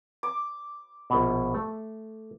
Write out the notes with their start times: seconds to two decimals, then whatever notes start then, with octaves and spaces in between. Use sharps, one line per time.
0.23 D6
1.10 A#1 B2
1.54 A3